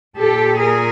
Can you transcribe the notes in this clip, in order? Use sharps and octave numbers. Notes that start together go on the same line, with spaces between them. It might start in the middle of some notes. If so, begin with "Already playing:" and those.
A#2 G4 A4
G#4 A#4